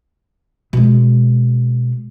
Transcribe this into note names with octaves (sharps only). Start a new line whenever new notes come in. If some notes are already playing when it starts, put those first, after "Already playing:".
B2 G#3